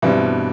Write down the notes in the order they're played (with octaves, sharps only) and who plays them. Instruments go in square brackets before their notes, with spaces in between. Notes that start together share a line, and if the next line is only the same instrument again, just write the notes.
[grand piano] G2 B2 [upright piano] E3 G3 C4 G4